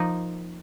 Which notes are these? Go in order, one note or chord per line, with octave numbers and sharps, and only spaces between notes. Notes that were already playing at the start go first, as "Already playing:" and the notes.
Already playing: F3 A#3 D#4